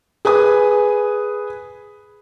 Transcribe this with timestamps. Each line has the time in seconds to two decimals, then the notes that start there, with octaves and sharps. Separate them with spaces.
0.25 G#4 B4 G#5 D#6